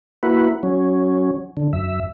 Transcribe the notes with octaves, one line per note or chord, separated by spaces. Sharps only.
A#3 E4 F#4 B4
F#3 C#4
D3
F#2 E5